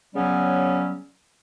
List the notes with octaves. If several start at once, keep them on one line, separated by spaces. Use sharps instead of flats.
C#3 F#3 G3 B3 C#4